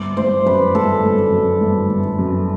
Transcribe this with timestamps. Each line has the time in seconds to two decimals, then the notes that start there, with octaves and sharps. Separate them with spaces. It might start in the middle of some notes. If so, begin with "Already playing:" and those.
Already playing: G1 D5
0.17 G1 C5
0.46 F#2 B4
0.75 G1 A4
1.04 G1
1.32 F#2
1.61 G1
1.90 G1
2.19 F#2